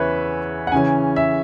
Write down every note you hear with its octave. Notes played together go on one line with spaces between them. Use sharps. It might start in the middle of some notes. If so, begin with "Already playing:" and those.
Already playing: E2 C#3 E3 B4 C#5 E5
F#5
C#3 E3 C#4 G#5
E5